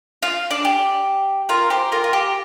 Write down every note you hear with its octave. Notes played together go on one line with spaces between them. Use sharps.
F4
D4
G4
F4 A#4
G4 C5
F4 A#4
F4
G4